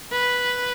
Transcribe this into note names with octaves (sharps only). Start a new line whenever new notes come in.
B4